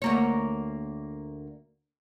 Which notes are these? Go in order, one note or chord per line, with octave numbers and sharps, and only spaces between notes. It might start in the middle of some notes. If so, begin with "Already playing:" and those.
D2 A#3 C#5